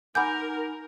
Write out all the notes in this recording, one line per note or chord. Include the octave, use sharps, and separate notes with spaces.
D#4 A#4 F#5 G#5 B5 D6 G6